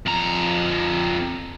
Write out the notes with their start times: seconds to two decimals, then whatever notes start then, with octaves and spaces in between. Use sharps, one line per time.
0.06 F2 A#5